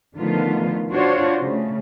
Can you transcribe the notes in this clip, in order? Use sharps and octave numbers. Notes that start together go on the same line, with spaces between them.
D3 D#3 F3 A3 B3 F4
D4 F4 F#4 C5 C#5
C#3 A3